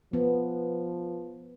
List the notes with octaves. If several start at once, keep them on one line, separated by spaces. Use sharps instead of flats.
F3 B3